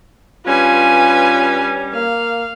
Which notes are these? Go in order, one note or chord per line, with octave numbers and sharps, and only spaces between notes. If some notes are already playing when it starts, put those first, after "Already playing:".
G2 G3 C#4 F4 B4 G#5
A#3 F5